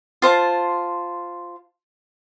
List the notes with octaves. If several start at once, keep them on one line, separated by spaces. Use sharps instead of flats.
F4 C5 A5